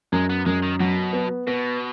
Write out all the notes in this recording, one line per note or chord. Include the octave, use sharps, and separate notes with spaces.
F#2 G#3
B3
F#2 G#3
D#3
B2 F#3
B3
B2 B3